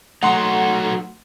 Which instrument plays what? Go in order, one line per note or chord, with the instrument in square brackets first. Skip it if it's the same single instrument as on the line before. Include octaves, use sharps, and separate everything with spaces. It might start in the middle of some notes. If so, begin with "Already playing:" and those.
[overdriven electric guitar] F#3 D#4 [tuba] A3 [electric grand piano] F#5 C6